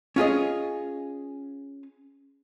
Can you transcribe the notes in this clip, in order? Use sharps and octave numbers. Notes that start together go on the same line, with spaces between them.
C#4 F4 G#4 D#5